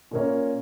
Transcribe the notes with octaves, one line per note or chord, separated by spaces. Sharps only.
A#2 A#3 C#4 A#4 C#5